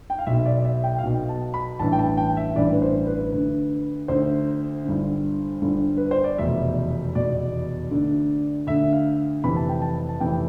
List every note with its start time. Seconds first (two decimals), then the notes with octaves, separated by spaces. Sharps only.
0.10 G5
0.19 F5
0.27 B1 B2 E5
0.45 D5
0.58 D5
0.65 E5
0.84 G5
0.98 F5
1.03 B1 B2 G5
1.29 A5
1.54 B5
1.79 A1 G2 E3 A5
1.92 G5
1.99 A5
2.17 G5
2.37 E5
2.56 A1 G2 E3 D5
2.72 B4
2.82 C5
3.07 B4
3.32 D2 D3
4.08 D2 D3 C5
4.85 G1 G2 D3
5.62 G1 G2 D3
5.97 B4
6.11 C5
6.24 D5
6.38 F1 E2 B2 E5
7.15 F1 E2 B2 D5
7.91 D2 D3
8.67 D2 D3 E5
8.93 F5
9.44 F1 F2 C3 E3 B5
9.56 A5
9.69 G5
9.82 A5
10.09 A5
10.20 F1 F2 C3 E3 G5